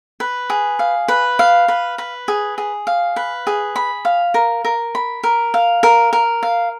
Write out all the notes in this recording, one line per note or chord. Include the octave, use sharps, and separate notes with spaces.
B4
G#4
F5
B4
F5
B4
B4
G#4
G#4
F5
B4
G#4
B5
F5
A#4
A#4
B5
A#4
F5
A#4
A#4
F5